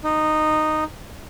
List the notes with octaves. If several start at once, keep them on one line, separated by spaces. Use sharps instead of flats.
D#4